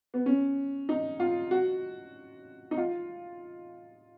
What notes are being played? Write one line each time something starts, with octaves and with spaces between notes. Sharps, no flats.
B3
C#4
D#4
F4
F#4
D#4
F4